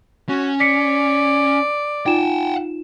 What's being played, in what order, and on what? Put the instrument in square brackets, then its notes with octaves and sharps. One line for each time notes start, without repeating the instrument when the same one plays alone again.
[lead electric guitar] C#4 [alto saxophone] F#4
[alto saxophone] D5 [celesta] B6 C#7
[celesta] D#4 F4 E7 [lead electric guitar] F#5 G5